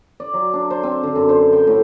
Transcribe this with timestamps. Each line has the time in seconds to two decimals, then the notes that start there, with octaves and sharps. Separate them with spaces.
0.20 D5
0.34 F#3
0.53 D4
0.70 C5
0.83 C4
1.03 D3
1.16 F#2
1.29 C5
1.53 G5
1.67 A2